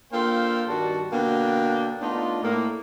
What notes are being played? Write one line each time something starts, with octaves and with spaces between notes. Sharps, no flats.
A#3 D4 F4 A4 C5 G5
G2 D#3 G3 F#4 A5
B2 D3 A#3 D4 G5
A3 B3 D4 D#4 F4
A2 A#3